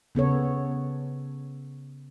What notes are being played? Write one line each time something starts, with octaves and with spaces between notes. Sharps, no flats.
C#3 B3 A4 C#5